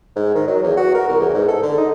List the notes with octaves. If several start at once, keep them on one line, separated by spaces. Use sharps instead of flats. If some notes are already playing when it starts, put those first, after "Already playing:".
G#2
D#3
F#3
E2
F#4
A#4
C2
E2
G#2
A4
D3
D#4